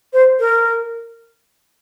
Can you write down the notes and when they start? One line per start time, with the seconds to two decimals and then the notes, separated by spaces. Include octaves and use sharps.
0.13 C5
0.39 A#4